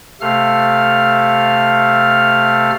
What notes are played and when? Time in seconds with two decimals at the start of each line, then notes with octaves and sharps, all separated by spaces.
0.21 C3 A3 A4 F5 F6